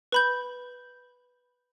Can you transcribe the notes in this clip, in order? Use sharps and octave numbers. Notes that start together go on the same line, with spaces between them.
B4 B5 G6